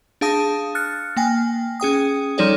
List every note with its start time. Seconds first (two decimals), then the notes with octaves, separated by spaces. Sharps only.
0.21 D4 G#4 F5 A5 D#6 A#6
0.75 F6 F#6 A6 C#7
1.17 A#3 G5 G#5
1.80 C#4 G#4 G5 D#6
2.38 F3 G3 D#4 A4 C#5 D5